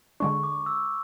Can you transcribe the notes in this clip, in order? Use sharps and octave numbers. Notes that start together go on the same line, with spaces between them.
D3 G#3 D4 C#6
D6
E6